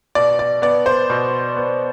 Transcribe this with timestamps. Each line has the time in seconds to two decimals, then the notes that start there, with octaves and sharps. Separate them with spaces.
0.15 B2 D5
0.39 D5
0.62 B3 D5
0.86 C5
1.10 B2
1.57 B3